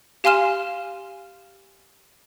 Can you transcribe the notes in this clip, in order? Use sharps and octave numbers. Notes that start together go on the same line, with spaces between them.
G4 F5 G#5 C6 F6 E7